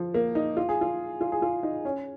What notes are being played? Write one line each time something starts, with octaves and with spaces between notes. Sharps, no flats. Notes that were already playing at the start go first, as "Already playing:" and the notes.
Already playing: F3
A#3
D#4
F4
G#4
F4
F4
G#4
F4
D#4
C#4